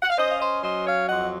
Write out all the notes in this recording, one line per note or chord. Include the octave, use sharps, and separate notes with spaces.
F#5
F5
C#4 C5 D#5
F5
C5 D#5
F#3 C5 D#5
C#5 F5
F2 D#5 F#5